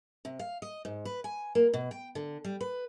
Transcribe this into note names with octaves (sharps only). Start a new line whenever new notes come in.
C3
F5
D#5
G#2
B4
G#5
A#3
B2
G5
D3
G3
B4